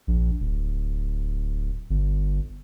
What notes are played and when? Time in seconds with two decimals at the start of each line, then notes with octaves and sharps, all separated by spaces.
0.07 A#1
0.40 D1
1.90 G1